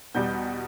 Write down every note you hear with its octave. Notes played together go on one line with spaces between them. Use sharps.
E2 B2 G3 G6